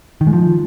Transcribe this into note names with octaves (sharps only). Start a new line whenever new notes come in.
D#3
G#3
F3